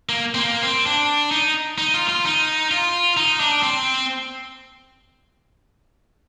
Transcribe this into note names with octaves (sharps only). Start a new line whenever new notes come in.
A#3
C4
A#3
C4
D4
D#4
D#4
F4
F4
D#4
F4
D#4
D4
C4